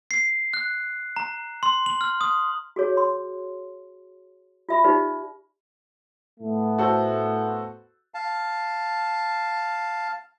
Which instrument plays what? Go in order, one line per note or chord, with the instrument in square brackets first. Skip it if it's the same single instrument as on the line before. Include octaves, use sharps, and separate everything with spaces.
[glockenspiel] C7
F#6
A#5
C6
F#7
F6
D#6
[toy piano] F#4 G#4 C#5
C6
F4 E5 B5
D#4 F4 G4 B4 D5
[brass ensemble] A2 A3 B3
[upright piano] F#4 A4 C5
[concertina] F5 A5